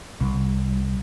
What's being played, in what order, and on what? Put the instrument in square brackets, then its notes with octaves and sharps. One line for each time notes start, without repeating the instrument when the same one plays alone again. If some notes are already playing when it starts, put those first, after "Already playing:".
[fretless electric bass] C2